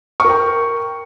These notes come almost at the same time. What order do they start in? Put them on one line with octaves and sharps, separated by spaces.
C#6 A#4 G5